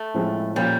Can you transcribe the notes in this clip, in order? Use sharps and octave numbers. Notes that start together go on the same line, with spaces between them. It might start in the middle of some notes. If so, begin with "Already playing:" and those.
Already playing: A3
A2 F3 G#3 C4
A#2 F3 G3 A#3 C#4 F4